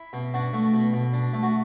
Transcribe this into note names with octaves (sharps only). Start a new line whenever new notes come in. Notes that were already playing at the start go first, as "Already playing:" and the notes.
Already playing: E4
B2
D4 F#4
A3
B2
B2
D4
A3
F#4